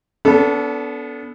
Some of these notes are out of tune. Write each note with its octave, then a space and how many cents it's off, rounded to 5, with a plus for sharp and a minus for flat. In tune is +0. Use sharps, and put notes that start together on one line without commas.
B3 +0 D4 -35 A4 +0